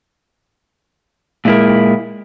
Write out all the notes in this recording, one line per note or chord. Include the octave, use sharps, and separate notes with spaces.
A#2 G#3 E4 A#4